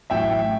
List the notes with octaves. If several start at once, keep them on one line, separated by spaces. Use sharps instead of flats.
A1 A2 F#3 E5 G5